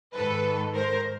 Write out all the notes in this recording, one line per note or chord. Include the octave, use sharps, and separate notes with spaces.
G#2 D#3 A4 B4
A#4 C5